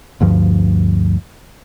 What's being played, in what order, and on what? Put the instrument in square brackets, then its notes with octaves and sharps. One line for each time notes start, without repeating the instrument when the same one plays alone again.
[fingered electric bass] D2 G2 F3